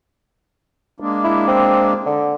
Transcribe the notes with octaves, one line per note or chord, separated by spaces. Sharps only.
G#3 A#3 D4
E4
C4
D3